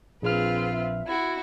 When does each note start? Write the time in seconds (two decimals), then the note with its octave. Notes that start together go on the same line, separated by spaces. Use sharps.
0.22 A#1 C4 F4 G#4 B4 F6
0.72 E5
1.07 E4 F#4